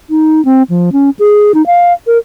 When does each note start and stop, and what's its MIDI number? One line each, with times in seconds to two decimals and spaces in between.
0.10 0.44 63
0.45 0.63 60
0.69 0.90 53
0.93 1.10 61
1.19 1.52 68
1.54 1.65 63
1.66 1.93 77
2.07 2.18 70